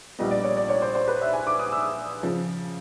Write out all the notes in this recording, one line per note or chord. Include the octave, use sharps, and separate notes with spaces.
A#1 A#2 G3 B3 D#5
D5
C#5
D5
C#5
C5
C5
B4
E5
G#5
D6
D#6
E6
C#3 F3